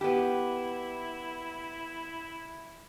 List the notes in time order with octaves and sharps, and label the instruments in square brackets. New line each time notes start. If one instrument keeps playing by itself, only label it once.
[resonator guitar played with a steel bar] B3 G4 [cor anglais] E4